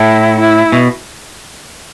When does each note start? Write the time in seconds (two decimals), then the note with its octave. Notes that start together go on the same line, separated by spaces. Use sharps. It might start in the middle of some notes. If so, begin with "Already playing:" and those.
Already playing: A2 E4
0.40 E4
0.72 B2